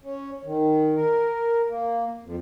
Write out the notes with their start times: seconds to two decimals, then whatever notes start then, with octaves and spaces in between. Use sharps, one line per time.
0.03 C#4
0.44 D#3
0.96 A#4
1.69 A#3
2.23 F2